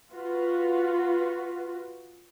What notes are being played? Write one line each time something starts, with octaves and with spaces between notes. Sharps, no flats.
F4 F#4 B4